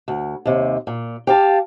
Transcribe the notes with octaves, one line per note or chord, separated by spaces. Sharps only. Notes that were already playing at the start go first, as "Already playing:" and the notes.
D2
D#2 C3
A#2
G4 F5 A5